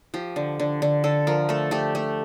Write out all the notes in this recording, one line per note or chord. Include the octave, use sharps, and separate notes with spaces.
F3 G4
D3
D3
D3
D3 A4
F3 A#4
A3 A4
A3 G4
A3